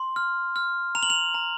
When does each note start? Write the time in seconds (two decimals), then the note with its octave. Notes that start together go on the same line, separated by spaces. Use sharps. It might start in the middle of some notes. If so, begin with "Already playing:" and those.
Already playing: C6
0.16 F6
0.56 F6
0.95 A#5 F7
1.03 F#7
1.10 F7
1.34 A#5